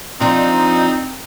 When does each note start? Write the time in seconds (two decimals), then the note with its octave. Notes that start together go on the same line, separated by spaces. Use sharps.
0.21 F3 C4 D4 D#4 F4